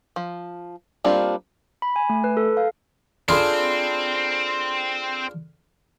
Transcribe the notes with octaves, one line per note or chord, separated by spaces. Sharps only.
F3
G3 A#3 C4 D4 F4
B5
G#5
A3
B4
A4
F5
C4 D4 F4 G#4 A4 B5 C6